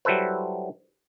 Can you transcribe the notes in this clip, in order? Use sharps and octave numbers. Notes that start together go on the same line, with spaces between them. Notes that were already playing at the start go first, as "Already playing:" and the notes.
F#3 G3 E4 A4 B4 C5